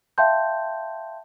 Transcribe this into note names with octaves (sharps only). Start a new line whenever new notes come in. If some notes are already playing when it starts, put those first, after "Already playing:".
E5 F5 G5 A5 C6 G6